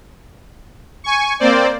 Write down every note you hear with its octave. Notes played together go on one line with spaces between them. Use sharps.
G#5 C#6
A#3 C4 C5 D5